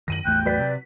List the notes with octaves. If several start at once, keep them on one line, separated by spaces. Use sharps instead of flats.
F#2 D#3 A#6 D#7 F#7
A1 E2 A3 G5 F#6
F#3 B4 D5 B6
C3